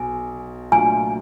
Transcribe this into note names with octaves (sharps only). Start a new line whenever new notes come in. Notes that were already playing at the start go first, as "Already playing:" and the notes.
Already playing: B1 B2 G#5
A#2 F#3 A3 D4 F4 G#5